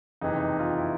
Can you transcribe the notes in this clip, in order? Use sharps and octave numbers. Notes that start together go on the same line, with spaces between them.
F#1 F2 C3 E3 D#4
D#4
F4
E4